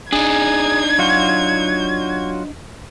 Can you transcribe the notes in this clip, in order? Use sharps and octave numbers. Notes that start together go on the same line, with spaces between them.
D4 D#4 G#4 G#6
F#3 F4 F#4